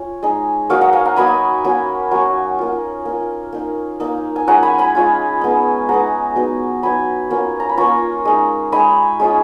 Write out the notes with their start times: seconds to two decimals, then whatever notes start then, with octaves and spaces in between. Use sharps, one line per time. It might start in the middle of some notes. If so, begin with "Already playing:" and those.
Already playing: C#4 F4
0.23 G#3 D#4
0.70 F#3 A#3 D#4 C#5 F5
0.81 D#5 F#5
0.93 F5 G#5
1.05 F#5 A#5
1.16 F#3 A#3 D#4 G#5 B5
1.64 F#3 A#3 C#4
2.11 F#3 A#3 C#4 A#5 C#6
2.59 A#3 F4
3.05 A#3 F4
3.53 A#3 D#4
4.00 A#3 D#4
4.36 G#5
4.47 G#3 C#4 F4 F#5 A#5
4.62 G#5 B5
4.78 G#5 B5
4.95 G#3 C#4 F4
5.41 G#3 B3 D#4
5.89 G#3 B3 D#4 F#5 A#5
6.36 F#3 B3 D#4
6.83 F#3 B3 D#4 G#5 B5
7.30 A#3 C#4 F4
7.60 A#5
7.69 B5
7.77 A#3 C#4 F4 A#5 C#6
8.25 G#3 D#4
8.72 G#3 D#4 G#5 B5
9.20 G#3 C#4 F4